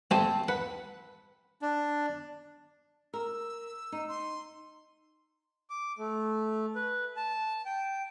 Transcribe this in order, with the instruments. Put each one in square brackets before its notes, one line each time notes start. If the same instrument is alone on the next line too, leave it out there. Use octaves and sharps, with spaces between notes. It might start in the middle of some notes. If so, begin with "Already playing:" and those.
[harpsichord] A3 G4 G#5 [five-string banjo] C4 A5
[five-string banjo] B4 [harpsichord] F#5
[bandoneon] D4
[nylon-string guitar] A#4 [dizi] E6
[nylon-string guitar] D#4
[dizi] C6
[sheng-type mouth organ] D6
A3
B4
A5
G5